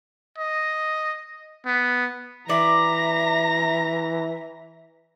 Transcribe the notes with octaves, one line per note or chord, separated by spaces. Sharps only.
D#5
B3
E3 D5 E5 A#5 A#6